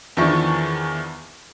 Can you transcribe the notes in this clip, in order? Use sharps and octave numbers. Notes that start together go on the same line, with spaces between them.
E2 D#3 F3 D4 E4 C#6